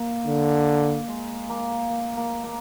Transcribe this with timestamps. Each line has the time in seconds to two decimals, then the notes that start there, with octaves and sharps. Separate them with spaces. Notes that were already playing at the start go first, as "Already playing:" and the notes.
Already playing: A#3
0.27 D3
1.08 G#3
1.49 A#3
1.90 A#3
2.17 A#3
2.44 A#3